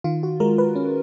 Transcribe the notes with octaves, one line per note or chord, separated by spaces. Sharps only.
D#3 F4
F#4
G#3 A#4
B4
C#4